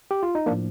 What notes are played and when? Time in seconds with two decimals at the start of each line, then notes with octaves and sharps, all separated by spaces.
0.11 G4
0.23 F4
0.35 D#4
0.46 A2 F3 A#3 D4